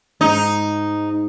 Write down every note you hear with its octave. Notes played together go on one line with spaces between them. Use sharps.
G#2 D#4